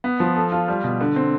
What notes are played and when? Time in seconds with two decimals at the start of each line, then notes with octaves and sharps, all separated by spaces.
0.04 B3
0.20 F3
0.36 A4
0.52 F4
0.68 G3
0.84 B2
1.01 D3
1.16 C4